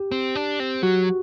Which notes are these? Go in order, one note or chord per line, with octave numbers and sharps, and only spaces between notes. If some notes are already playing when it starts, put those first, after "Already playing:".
Already playing: G4
C4
D4
C4
F#3 F#4